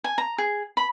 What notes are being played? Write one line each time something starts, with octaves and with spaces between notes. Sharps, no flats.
G#5
A#5
G#4
B5